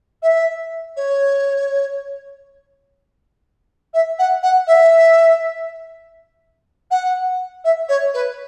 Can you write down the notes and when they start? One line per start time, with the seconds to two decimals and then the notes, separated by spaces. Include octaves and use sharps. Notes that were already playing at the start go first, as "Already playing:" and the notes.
0.22 E5
0.96 C#5
3.93 E5
4.18 F#5
4.42 F#5
4.67 E5
6.90 F#5
7.64 E5
7.88 C#5
8.13 B4